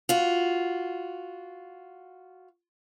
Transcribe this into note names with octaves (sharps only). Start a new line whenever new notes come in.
F4 F#4